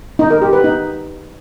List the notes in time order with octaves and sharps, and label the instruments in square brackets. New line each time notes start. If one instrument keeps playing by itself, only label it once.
[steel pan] D#4
A#4
G4
B4
D#4